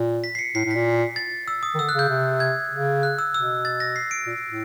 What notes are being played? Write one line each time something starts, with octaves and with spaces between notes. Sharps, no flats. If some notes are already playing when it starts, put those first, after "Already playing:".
Already playing: A#2
B6
C7
C#7
A2 C7
A2
A#2 B6
A6
E6
D#6
D#3
D3 E6
F#6
C#3 G6
C3
G#6
C#3
F#6
E6
B2 E6
A6
A#6
C7
D7
A#2
A2